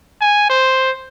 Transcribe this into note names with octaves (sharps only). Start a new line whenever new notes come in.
G#5
C5